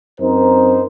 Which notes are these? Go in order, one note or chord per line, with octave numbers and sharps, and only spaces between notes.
F#2 C4 D#4 A#4 C5